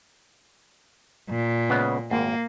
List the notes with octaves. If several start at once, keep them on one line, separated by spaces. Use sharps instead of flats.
A#2
C#3 G#3 B3
G#1 A#3